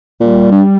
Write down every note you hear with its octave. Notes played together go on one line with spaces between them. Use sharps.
A#2 G3
G2